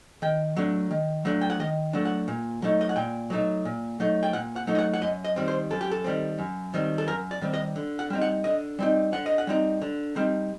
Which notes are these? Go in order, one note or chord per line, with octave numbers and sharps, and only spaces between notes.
D#3 G5
F#3 A3 D4
D#3
F#3 A3 D4
G5
F#5
D#3 D#5
F#3 A3 D4
F#5
A#2
F#3 A3 D#4
D#5
F#5
A#2 G5
F#3 A3 D#4
A#2
F#3 A3 D#4
G5
A#2 F#5
F#5
F#3 A3 D#4
D#5
F#5
F#5
F#2 D#5
D#5
D#3 G3 C4
C5
F#2 A4
G4
A4
D#3 G3 C4
F#2
D#3 G3 C4
A4
F#2 A#4
D5
D#3 G3 C4
D#5
D3
F#5
G3 C4 D#4
F#5
D3 D#5
G3 C4 D#4
D3 F#5
D#5
F#5
G3 C4 D#4
D3
G3 C4 D#4